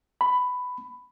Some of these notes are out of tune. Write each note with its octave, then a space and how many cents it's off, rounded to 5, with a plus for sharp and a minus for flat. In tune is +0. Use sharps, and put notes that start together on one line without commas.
B5 +10